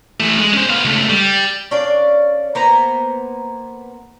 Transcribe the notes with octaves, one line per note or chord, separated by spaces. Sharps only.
E3 A3
G#3
C#4 C5
B3 F5
C#2 A3
G3
C#4 D4 D5 F5
A#3 B3 C5 A#5